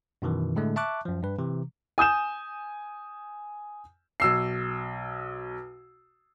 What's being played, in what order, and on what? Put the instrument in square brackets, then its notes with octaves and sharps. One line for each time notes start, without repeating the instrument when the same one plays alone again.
[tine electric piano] F#2 B2 D#3 E3
A2 D3 G#3 A3
E5 A5 C#6 D6 F#6
F#2 F3
G2 B4
C3 E3
[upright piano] G#5 D#6 G6 E7
B1 E6 C7